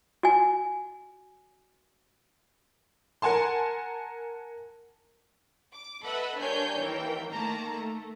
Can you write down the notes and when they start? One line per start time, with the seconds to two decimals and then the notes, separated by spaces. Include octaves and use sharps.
0.23 F#4 G#5
3.22 A#4 F#5 G#5 A5 C6
5.71 D6
6.03 A4 B4 D#5 E5 F#5 B5
6.38 G2 D4 A#4 C#5 G#5 G6
6.79 D#2 E3 A#4 G5
7.31 D#3 A3 A#3 A5 A#5
7.75 A3